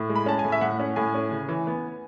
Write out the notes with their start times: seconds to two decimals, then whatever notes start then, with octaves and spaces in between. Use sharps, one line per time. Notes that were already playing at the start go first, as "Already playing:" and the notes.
Already playing: A2
0.10 G#3
0.16 B5
0.26 C#4 A5
0.39 G#5
0.45 A2
0.52 E5
0.61 A2 F#5
0.80 C#4
0.96 A2 G#5
1.15 C#4
1.31 C#3
1.49 E3
1.67 B3